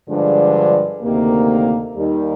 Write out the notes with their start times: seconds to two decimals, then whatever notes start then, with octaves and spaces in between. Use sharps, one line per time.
0.09 G2 D3 F3 G#3 D4
1.03 D2 C3 D#3 A#3
1.97 D#2 D#3 G3